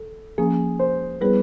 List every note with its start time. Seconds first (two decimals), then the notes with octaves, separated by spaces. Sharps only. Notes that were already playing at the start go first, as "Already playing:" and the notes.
Already playing: A4
0.38 F3 A#3 C#4 G#4
0.79 C5
1.21 G3 B3 E4 G#4 B4 C#5